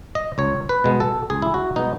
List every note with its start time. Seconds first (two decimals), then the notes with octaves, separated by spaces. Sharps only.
0.15 D#5
0.38 C#2 C#5
0.69 B4
0.84 B2 G#3 B3
1.00 A4
1.30 C#2 G#4
1.42 E4
1.54 F#4
1.76 B2 G#3 B3 D#4